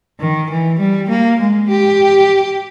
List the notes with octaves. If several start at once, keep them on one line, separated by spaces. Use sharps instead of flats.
D#3
E3
G3
A#3
G#3
G4